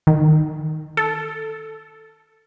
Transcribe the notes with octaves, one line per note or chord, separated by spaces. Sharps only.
D#3
A4